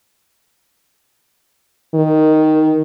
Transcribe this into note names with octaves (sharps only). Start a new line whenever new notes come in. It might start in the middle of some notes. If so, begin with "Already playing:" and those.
D#3